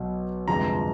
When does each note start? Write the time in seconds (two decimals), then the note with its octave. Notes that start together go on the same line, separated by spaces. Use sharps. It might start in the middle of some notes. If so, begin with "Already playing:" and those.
Already playing: B1 B2 F#3
0.47 G1 F2 C3 F3 G#3 A#5